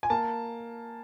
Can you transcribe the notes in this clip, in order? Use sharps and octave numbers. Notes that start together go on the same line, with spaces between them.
G#5
A#3 A5